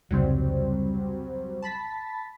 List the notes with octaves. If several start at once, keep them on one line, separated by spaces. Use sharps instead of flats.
F1 C#2 G#2 F#3 G3 C4
A5 B5 B6